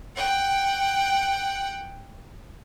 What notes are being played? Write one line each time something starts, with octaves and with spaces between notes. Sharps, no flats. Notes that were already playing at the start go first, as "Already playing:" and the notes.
F#5 G5